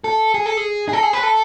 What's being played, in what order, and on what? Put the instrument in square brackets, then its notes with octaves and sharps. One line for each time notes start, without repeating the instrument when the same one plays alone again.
[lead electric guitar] A4
G#4
A4
G#4
G#4
A4
G#4
B4
A4